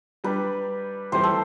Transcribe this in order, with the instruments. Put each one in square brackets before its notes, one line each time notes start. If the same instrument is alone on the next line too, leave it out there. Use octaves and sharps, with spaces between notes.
[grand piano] G3 D4 G4 [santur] B4
[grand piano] A2 E3 G3 C4 G4 [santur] C5
[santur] A4